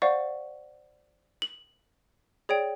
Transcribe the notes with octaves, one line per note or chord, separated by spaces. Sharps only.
C5 D5 F5 F#5 C#6
F#7
G#4 C#5 D5 G5